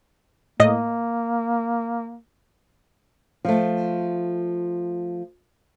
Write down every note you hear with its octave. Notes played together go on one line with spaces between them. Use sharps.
A2 A#3 D#5
F3 A3